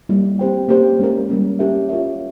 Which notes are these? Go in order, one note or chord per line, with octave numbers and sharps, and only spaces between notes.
G3 A#3 E4
C4 G4 C5 G5
A#3 C#4 G4 C5
G#3 C#4 E4 A#4
G3 A#3 C#4
C#4 E4 G4 A#4 E5
F4 A#4 C#5 E5